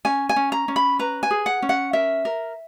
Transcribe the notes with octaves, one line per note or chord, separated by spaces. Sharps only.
C#4 G#5
G#5
C#4
A#5
C#4
B5
B4 A#5
G#5
G#4
F#5
C#4
F#5
A#4 E5
A#4